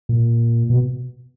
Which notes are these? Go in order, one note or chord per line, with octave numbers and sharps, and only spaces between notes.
A#2
B2